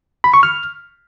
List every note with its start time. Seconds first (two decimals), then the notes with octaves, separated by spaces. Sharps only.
0.24 B5
0.34 C#6
0.43 F6